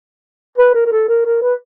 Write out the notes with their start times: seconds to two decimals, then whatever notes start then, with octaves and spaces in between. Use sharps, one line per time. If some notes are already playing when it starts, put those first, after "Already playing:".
0.58 B4
0.75 A#4
0.86 A#4
0.92 A4
1.09 A#4
1.25 A#4
1.42 B4